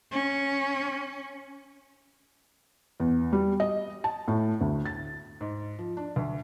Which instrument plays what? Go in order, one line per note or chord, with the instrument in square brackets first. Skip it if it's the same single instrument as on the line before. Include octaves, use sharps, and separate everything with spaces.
[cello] C#4
[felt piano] E2
G3
D#5
A5
A2
D2
A6
G#2
F3
D4
D2